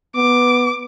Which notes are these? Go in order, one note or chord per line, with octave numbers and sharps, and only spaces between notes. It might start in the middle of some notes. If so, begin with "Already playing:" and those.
B3 D6